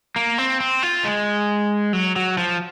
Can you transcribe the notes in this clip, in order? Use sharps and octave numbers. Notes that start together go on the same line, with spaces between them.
A#3
C4
C4
F4
G#3
F#3
F#3
F3